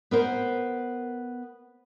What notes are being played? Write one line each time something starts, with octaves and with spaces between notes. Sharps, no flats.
B3 A#4 C5